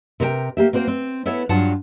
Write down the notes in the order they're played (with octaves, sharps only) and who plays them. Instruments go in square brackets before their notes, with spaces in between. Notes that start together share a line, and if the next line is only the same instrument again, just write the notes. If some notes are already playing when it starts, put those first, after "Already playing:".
[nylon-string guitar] C3 A#4 E5 G5
A#3 G4 E5
A#3 C4 F#4 C5
C4
B3 E4 A4 C#5 E5
G2 F#3 F4 F5 F#5 A5